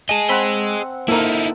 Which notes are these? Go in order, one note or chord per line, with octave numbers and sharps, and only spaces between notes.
G#4 D#5 G#5 A5
C4 F#5 B5 B6 G7
A#3 D#4 E4 A4 A#4